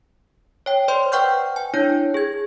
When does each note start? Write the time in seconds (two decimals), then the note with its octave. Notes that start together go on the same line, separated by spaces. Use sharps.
0.66 C#5 G5
0.88 C5 D5 C6
1.12 B4 F#5 G5 C#6 F6 G6
1.56 G#5
1.74 D4 E4 C#5 G6
2.14 G#4 G#6